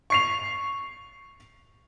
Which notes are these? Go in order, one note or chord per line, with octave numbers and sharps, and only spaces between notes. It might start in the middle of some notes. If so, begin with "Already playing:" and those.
C#6 C7 F7